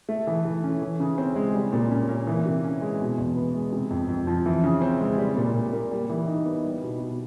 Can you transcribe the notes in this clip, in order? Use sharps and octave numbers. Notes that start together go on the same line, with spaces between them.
A3
E3
E3
C#4
E3
C#3
C4
G#3
G3
A#2
C#4
A#3
E3
C3
C#4
G#3
B2
E2
B3
G#3
C3
F2
F2
F3
E3
C#3
C4
G#3
G3
A#2
A#2
A#3
G3
E3
D#4
B3
G3
B2
B2